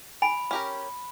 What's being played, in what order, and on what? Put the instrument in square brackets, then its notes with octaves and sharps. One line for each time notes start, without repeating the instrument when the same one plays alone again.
[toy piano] G#5 [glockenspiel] B5
[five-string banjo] C#4 G4 A#4